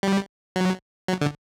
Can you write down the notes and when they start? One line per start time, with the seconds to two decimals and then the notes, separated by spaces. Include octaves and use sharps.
0.03 G3
0.56 F#3
1.08 F#3
1.21 D3